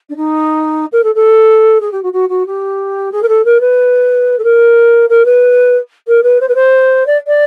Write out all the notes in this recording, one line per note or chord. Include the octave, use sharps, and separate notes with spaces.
D4
D#4
A#4
A4
A4
G#4
G4
F#4
F#4
F#4
G4
G#4
A#4
A4
A#4
B4
A4
A#4
A#4
B4
A#4
B4
C5
B4
C5
D5
D5